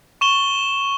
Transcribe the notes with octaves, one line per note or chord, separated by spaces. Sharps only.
C#6 E7 G7